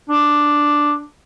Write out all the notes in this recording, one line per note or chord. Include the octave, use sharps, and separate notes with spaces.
D4